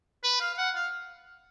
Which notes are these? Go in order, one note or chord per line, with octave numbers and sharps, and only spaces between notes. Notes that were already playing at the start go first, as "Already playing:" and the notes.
B4
F5
F5
F#5
F5